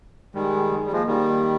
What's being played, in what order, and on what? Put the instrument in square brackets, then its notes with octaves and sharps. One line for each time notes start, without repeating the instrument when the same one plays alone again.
[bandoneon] D#3 G3 [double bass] G#3
[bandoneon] G3
[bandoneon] F3 G#3 [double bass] A#3
[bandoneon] D#3 G3